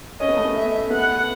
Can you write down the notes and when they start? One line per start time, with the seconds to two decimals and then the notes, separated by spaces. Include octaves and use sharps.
0.20 C#4 D#5
0.28 B3
0.37 A3
0.45 B3
0.56 E5
0.90 B3 F#5